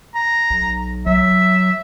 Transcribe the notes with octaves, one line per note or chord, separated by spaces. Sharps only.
A#5
B1
F#3 E5